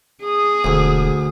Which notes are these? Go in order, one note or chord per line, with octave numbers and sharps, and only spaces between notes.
G#4 D#6
E1 D2